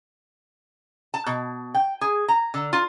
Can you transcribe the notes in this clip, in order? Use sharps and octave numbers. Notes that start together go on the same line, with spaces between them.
A5
B2
G5
G#4
A#5
D3
F4